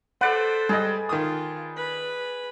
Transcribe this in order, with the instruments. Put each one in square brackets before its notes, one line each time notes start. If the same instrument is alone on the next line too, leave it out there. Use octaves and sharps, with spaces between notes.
[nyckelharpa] A4 C5 [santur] B4 D5 [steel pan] F#5
[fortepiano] G3 D#5 [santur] G#4
[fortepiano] D#3 D#6 [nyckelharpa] F4
[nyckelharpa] B4 B5